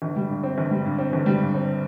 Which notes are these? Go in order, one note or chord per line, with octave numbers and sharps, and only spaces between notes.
G1
G3
G2
C4
G1
G3
G2
C4
G1
G3
G2
C4